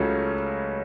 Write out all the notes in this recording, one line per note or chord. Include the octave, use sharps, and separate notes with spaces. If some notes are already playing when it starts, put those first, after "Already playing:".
Already playing: C#2 C#3 F#3 A3 C#4